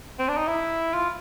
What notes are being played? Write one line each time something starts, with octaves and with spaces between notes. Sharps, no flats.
C4
D4
D#4
E4
F4